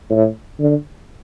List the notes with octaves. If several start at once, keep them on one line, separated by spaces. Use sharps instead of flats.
A2
D3